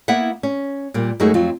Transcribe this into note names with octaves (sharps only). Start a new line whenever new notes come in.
A#3 B3 E4 E5 F#5
C#4
A#2 G3 A#3
F#2 G#3 A3 D#4 F#4 G#4
F2 F#3 F4